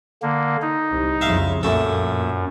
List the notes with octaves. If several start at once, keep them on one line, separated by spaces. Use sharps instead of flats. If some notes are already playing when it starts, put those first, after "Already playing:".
D3 A#3
D#4
C2
C2 F2 C#3 E5 F5
A#1 F#2 A#2 A3 A4